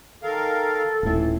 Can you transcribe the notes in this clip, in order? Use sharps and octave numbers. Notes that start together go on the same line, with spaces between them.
D#3 A4 A#4 F5
D#1 A2 E3